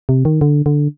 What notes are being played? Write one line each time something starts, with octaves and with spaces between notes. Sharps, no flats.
C3
D#3
D3
D3